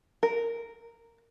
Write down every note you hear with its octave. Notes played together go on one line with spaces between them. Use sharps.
A#4